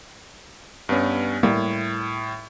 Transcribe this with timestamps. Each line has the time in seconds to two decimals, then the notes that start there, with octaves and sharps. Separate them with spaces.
0.89 G2 B3 C#4
1.43 A2 G3 A#3